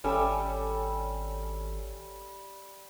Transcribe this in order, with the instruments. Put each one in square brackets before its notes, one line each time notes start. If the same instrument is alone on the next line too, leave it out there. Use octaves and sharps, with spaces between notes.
[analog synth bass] G#1 [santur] G3 E5 E6 [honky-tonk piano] C#4 A4 G#5